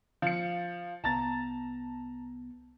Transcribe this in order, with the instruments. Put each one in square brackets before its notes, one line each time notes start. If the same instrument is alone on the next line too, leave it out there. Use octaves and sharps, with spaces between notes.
[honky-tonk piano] F3 C#7 [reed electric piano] F5
[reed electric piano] C2 B3 [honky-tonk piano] A5 A#5 A6